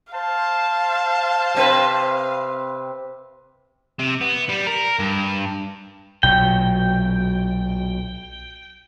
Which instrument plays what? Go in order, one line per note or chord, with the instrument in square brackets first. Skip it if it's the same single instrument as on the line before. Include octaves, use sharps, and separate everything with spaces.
[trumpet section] C5 A5 [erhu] F5
[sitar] C3 C4 B4
[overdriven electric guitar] C3
B3
G3
A#4
G2
[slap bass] B1 A#2 F#3 [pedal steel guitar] G5